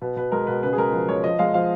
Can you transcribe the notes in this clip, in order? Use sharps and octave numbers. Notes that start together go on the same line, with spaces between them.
B2 B4
B2 B4
G#3 A#4
B2 B4
C#3 B4
G#4
G#3 A#4
F3 B4
G#3 C#5
F3 D#5
G#3 F5
F3 F5